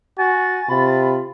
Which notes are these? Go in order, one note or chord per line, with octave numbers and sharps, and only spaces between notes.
F#4 G#5 A6
C3 F4 B5